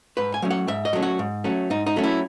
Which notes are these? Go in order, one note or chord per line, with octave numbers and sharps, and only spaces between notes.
G#2 B4
G#5
F#3 A3 C#4
F#5
G#2 E5
D#5
F#3 A3 C#4
F#4
G#2
F#3 A3 C#4
G#2 D#4
D#4
F#3 A3 C#4
E4